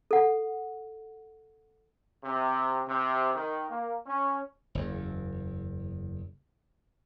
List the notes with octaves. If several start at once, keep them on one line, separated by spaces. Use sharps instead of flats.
A4 F#5
C3
C3
D#3
A#3
C#4
F#1 E2